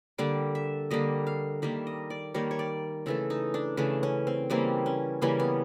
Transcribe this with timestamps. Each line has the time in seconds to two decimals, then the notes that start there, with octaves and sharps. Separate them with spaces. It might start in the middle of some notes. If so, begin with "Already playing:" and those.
0.18 D3 G3 A#3 D5
0.55 E5
0.91 D3 G3 A#3 D#5
1.27 F5
1.62 D#3 G3 A#3 E5
1.87 D#5
2.10 D5
2.34 D#3 G3 A#3 C#5
2.51 C#5
2.59 D5
3.06 C#3 E3 A3 A4
3.30 D#4
3.54 D4
3.77 C#3 E3 A3 D4
4.03 C#4
4.27 C4
4.50 C#3 E3 G3 A#3 C4
4.86 C#4
5.22 C#3 E3 G3 A#3 C#4
5.40 B3